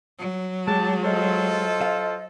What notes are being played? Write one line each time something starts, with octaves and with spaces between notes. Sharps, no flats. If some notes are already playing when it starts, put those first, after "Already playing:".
F#3
G#3 G4 A5
F4 A4 C5 D#5
F5